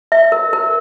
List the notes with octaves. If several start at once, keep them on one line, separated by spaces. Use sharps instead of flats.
E5
A#4
A#4